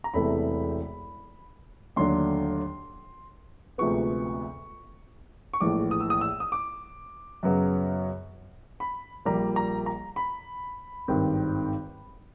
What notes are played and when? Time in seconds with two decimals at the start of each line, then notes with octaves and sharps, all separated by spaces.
0.04 A#5
0.14 E1 E2 C3 E3 A3 B5
1.96 D#2 D3 F#3 A3 D4 C6
3.78 D2 C3 F3 G#3 B3 C#6
5.54 C#6
5.61 A#1 A2 E3 G#3 D6
5.91 D#6
6.01 E6
6.10 D#6
6.21 E6
6.40 D#6
6.52 D6
7.43 F#2 C#3 F#3 B3
8.80 B5
9.25 A#1 A#2 G3 A#3 A#5
9.56 A#5
9.86 A#5
10.16 B5
11.08 G#1 G2 D#3 G3 C4